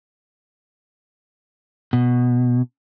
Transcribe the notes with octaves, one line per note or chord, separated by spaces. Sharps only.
B2